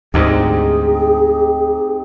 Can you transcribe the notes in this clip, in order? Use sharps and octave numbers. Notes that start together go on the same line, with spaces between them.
D2 G#2 C4 D#4 G4 G#4